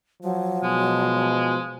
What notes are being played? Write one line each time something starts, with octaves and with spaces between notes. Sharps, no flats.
F3 F#3
B2 G#3